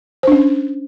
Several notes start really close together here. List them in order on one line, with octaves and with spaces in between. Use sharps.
C5 D4 C#4